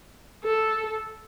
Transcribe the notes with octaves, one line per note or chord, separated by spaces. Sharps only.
A4